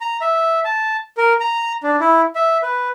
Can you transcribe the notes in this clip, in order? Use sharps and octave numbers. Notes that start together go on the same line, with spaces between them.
A#5
E5
A5
A#4
A#5
D4
E4
E5
B4